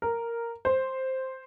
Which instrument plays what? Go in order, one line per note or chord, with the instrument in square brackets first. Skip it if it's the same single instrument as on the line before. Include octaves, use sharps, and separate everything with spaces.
[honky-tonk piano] A#4
C5